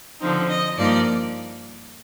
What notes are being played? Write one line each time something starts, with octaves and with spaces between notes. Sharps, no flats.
D3 F3 C4 D#4
D#5
G2 F3 A#3 D#4 D5